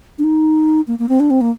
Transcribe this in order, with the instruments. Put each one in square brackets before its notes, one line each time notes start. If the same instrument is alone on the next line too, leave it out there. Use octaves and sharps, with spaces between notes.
[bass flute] D4
D#4
A#3
A#3
C4
D4
C4
A#3